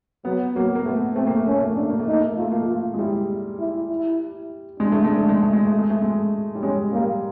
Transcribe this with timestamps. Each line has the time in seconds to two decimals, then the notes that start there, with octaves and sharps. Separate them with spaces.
0.25 F#3 B3
0.55 F#3 A#3
0.75 A#3
0.85 A3 B3
1.16 A3 C4
1.27 A#3
1.36 A3
1.47 A#3 C#4
1.57 A3
1.68 A#3
1.76 A3 D4
1.89 A#3
2.00 A3
2.07 A#3 D#4
2.20 A3
2.30 A#3
2.37 A3 F4
2.51 A#3
2.61 A3
2.68 F4
2.94 G#3
2.99 G3 E4
3.59 E4
3.90 E4
4.80 G#3 D4
4.92 A3
5.04 G#3
5.17 A3
5.29 G#3
5.42 A3
5.53 G#3
5.66 A3
5.78 G#3
5.90 A3
6.02 G#3
6.55 G3
6.62 G#3 C#4
6.93 G3 A#3